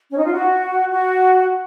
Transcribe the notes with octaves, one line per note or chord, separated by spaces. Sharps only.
C#4
D#4
F4
F#4
F#4